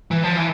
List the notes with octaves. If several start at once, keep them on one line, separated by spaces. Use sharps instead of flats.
E3
F3
E3